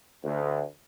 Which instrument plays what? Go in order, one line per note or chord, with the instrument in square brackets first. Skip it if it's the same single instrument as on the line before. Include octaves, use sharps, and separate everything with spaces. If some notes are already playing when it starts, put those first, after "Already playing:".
[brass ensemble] D2